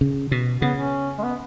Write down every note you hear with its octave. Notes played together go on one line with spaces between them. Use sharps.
C#3
B2
C#3 B3
C#4
G#3
B3